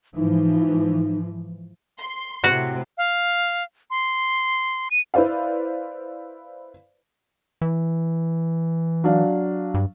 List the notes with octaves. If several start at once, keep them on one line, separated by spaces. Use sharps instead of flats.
G#2 E3 F3 D#4
C6
A2 C3 F#4 F#5
F5
C6
D#7
E4 B4 C5 D5 F5
E3
F#3 D4 F5
G2